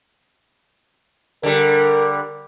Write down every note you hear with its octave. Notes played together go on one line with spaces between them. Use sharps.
D3 G3 A#4